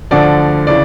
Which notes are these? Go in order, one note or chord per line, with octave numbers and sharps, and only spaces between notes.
D2 D3 F3 D5
C#3 E3 D5